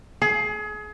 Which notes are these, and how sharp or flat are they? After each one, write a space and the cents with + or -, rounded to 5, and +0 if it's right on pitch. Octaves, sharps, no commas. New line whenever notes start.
G#4 +30